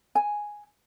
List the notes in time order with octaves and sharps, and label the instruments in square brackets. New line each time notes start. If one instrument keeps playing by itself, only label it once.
[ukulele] G#5